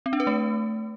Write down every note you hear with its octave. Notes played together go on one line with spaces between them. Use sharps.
C4
D4
B4
A3